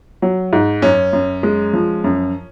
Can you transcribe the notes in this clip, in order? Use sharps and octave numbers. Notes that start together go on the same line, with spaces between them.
F#3
G#2
F#2 C#4
F#2
G#3
F3
F#2